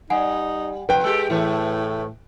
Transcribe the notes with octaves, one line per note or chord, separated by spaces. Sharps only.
G3 D#4 F#5 G#5
F2 B4 G5
G#3 G4 A4
A2 E3 A3